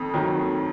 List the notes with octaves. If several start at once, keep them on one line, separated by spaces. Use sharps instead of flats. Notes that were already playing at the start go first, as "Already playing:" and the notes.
Already playing: F2 D#3
D#3 F#3